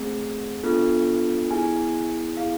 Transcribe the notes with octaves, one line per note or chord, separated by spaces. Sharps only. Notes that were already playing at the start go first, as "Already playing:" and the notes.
Already playing: A3 C4 G#4
B3 D4 F4 A4
B3 E4 G#4 G#5
B3 E4 G#4 F5